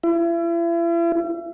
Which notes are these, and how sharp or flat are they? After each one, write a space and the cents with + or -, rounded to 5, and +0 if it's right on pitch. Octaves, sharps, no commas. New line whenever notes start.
E4 +40